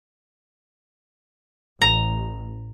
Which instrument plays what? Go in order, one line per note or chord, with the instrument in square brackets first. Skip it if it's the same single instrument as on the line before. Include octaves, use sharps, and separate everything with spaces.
[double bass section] A1 [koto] A#5